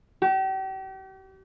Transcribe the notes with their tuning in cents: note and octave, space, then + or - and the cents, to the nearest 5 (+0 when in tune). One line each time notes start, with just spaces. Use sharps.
G4 -40